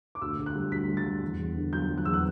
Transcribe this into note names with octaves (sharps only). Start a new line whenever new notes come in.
D6
D2 E6
D2
F#6
G3
D2 B6
G3
A6
G3
E2
E2
D3
F#3 G6
F#3
F#6
E2 E6
F#6